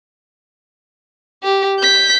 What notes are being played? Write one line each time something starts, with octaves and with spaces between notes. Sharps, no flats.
G4
G6 B6